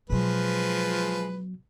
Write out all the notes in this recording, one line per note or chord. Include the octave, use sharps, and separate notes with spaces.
B2 F3 F#3 G#3 B4